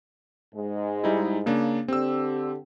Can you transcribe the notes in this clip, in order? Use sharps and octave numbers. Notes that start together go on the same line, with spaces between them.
G#2 G#3
G3 D#4 E4
C#3 A#3 D4
D3 C4 G4 E6